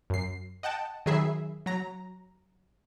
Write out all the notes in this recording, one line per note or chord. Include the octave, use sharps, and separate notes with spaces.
F#2 C7
D#5 F#5 G5 A5
D#3 F#3 G#4 E5 B5 C7
F#3 A#5 A#6